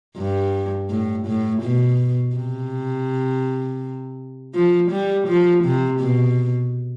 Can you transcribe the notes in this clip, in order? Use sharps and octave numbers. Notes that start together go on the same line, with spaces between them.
G2
A2
A2
B2
C3
F3
G3
F3
C3
B2